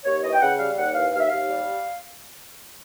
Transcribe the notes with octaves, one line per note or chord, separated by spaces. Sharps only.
D#2 C#5
E3 D#5
G5
C#3 F#5
G3 F5
D#2 F#5
E3 F5
D#2 F5
E5
D#2 F5
G3